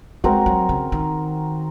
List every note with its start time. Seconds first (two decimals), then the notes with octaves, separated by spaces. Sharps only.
0.24 G#3 C4 F#4 A#4
0.46 F#3
0.69 C#3
0.92 D#3